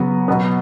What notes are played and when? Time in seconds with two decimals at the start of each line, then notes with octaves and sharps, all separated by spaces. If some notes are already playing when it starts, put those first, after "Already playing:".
Already playing: C#3 F#3 B3
0.28 B2 F#3 B3